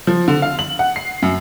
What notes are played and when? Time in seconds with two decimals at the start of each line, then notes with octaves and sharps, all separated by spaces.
0.07 F3
0.28 D3
0.42 F5
0.59 F#7
0.79 F#5
0.96 C7
1.22 F#2